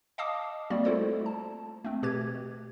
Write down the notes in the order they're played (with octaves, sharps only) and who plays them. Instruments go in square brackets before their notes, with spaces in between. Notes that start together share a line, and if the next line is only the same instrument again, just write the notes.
[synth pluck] D#5 F5 A5 D6 D#6
G3 A#3 C4 F#4 D5
A3 E4 F4 A4 C5 D5
A5
A3 C4
B2 G4 B4 G#6